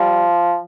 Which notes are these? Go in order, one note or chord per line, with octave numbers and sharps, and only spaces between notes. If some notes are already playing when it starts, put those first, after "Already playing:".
Already playing: F3 G3